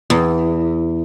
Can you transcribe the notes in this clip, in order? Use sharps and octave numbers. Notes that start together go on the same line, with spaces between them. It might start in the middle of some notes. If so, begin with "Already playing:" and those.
E2